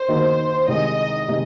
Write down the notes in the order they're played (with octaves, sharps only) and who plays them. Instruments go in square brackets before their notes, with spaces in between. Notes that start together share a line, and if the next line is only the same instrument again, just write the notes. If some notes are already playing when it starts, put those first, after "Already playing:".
Already playing: [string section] C5
[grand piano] D#2 D#3 A#3 D#4 F#4
[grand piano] C2 C3 D#3 G#3 D#4 [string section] D#5
[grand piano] C3 D#3 G#3 D#4